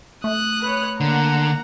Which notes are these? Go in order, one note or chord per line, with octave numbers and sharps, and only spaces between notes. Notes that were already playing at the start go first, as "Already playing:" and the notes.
A3 D#6 F#6
B4 C#5
D3 A#3 F#5 A#5